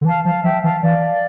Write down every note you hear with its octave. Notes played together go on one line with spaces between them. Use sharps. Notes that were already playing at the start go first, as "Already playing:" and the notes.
D3
E3 F5 A5
F3 F5 A5
F3 E5 G5
E3 F5 A5
E3 D5 F5